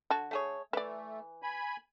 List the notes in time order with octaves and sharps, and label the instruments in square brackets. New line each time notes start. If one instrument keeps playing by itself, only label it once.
[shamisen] D3 F#4 A5
[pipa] A3 G#4 C#5
[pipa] E3 [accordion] A3 [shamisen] B4 D5
[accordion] G#5 B5